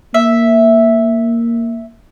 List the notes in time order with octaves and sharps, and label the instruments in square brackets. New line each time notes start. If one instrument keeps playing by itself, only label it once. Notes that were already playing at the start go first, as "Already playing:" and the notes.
[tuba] A#3 [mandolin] E5